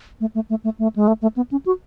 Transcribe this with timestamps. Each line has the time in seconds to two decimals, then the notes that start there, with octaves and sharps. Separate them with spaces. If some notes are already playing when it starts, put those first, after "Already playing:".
0.21 A3
0.35 A3
0.50 A3
0.64 A3
0.79 A3
0.96 G#3
1.08 A3
1.22 A3
1.36 B3
1.51 C#4
1.66 F#4